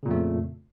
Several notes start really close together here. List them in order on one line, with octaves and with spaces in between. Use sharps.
C#3 A#2 F2 A3